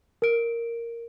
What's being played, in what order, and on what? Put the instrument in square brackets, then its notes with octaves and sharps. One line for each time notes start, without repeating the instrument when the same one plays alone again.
[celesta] A#4 D7